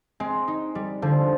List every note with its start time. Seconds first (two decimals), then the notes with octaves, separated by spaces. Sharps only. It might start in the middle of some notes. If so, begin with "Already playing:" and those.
0.20 G#3 C4
0.48 D#4
0.75 G3
1.02 D3 F3